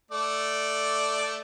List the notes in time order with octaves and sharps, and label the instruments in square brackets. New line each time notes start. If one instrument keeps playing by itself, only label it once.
[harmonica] A3 D5